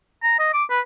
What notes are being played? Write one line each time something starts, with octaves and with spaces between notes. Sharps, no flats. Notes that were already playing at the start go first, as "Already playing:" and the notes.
A#5
D#5
D6
B4